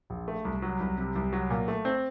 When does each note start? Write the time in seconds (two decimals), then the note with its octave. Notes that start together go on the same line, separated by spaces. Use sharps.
0.10 A#1
0.28 A3
0.45 C2
0.62 F#3
0.80 C2
0.98 C3
1.15 C2
1.33 F#3
1.50 A#2
1.68 A3
1.85 C4